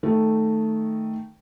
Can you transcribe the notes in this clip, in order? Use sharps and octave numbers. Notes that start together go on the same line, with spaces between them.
D#3 A3